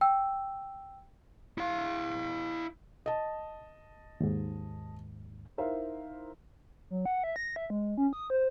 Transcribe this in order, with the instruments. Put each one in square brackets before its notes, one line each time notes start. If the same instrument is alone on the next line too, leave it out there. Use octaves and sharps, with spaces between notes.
[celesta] G5 E6
[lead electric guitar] E4 F5
[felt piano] D#5 A5
[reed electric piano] D#2 G#2
[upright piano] D#4 E4 A#4 C5 E5 F5
[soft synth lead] F#3
F#5
E5
A#6
E5
G#3
C#4
D#6
C5